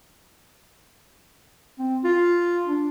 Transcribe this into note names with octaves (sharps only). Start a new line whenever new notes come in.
C4
F4
D4